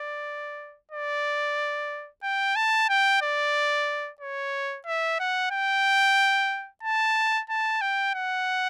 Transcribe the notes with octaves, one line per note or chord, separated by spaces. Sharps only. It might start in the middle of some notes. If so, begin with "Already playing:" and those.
Already playing: D5
D5
G5
A5
G5
D5
C#5
E5
F#5
G5
A5
A5
G5
F#5